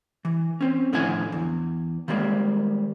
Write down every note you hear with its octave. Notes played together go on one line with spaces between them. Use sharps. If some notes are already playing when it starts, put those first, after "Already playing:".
E3
C4 C#4
A2 D3 D#3 F3 F#5 G#5
E2
D#3 G3 G#3 A#3